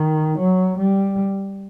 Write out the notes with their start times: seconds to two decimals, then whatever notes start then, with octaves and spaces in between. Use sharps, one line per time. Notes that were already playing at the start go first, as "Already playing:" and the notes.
Already playing: D#3
0.39 F#3
0.78 G3